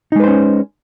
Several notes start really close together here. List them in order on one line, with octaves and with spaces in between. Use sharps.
D#4 G#3 B4 C5 C#4